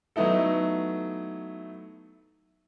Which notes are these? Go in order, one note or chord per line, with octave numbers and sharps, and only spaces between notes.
F#3 A3 B3 D#4 E4 A4